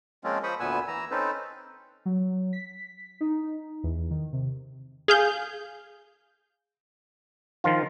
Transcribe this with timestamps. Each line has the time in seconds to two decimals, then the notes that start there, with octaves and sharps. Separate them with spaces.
0.24 F3 G#3 A#3 C4 C#4 F4
0.43 F3 C5 B5 C#6 D#6
0.60 D2 A#2 B3 B4 G#5 E6
0.88 E3 A#5 E6
1.11 C4 C#4 D#4 A4 B4 C5
2.06 F#3
2.53 B6
3.21 D#4
3.84 E2
4.11 D#3
4.33 C3
5.08 G#4 F5 G6
7.64 D#3 F3 F4